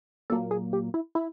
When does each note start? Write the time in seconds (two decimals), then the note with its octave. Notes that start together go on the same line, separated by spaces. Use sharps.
0.30 A#2 F#3 A#3 A4
0.51 G#4
0.73 G4
0.94 E4
1.15 E4